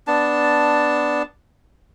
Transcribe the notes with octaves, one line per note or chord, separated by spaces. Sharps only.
B3 D4 A5